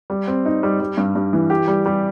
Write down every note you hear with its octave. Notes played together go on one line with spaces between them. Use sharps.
G3
C4
D#4
G3
G3
G2
G2
E3
G4
G3
G3